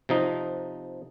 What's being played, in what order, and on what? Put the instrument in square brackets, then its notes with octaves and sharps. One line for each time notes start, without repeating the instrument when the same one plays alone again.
[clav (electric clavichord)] C3 F3 D#4